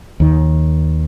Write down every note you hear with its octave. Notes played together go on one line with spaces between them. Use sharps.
D#2 D#3